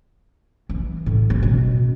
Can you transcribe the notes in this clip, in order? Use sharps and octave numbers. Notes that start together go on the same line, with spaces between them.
E3
A2
C#4
B2